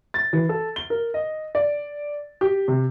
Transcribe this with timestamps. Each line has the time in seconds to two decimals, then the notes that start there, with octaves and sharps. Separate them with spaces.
0.14 A6
0.33 E3
0.49 A4
0.76 G7
0.90 A#4
1.14 D#5
1.55 D5
2.41 G4
2.68 C3